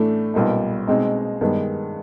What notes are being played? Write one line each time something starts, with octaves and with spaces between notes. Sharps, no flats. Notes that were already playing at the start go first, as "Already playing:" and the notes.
Already playing: A2 E3 A3 D4
B1 A#2 G3 B3 D#4
B2 G#3 C4 D#4
G2 D#3 G#3 B3